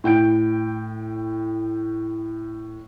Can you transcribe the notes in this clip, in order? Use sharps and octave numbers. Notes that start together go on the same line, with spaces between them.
A2 G5 G6 D7